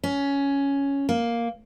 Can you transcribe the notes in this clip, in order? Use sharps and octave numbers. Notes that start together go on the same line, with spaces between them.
C#4
A#3